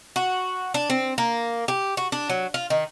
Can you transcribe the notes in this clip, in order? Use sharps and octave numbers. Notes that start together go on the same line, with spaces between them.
F#4
D4
C4
A#3
G4
F#4
D4
F#3
F4
D#3